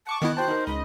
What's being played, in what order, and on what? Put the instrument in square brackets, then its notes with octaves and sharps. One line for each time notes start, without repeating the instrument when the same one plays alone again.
[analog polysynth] F#5 C#6 D6 [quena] A5
[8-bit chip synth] D#3 B3 E4 [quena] D#5 [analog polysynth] F#6
[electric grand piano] F#4 G5 A5 [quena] C5
[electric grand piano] D#4 A#4
[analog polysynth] C#2 D#5 [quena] B5